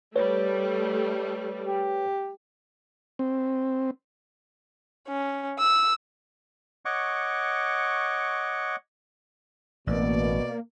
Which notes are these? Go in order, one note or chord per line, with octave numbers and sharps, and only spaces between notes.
G3 A3 B4 C#5
G4
C4
C#4
E6
C#5 D#5 F#5 C#6 D6
A1 B2 A#3 D5